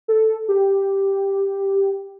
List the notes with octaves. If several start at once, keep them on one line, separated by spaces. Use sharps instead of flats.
A4
G4